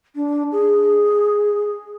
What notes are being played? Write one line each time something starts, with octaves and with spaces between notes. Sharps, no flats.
D4
G#4